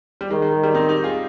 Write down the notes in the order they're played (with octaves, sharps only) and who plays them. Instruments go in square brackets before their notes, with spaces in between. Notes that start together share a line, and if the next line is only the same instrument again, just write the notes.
[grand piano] G3
[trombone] D#3 [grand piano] G#3
[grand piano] G#3
G#3
G3
C4 D#4
D#4 G4
F4 G#4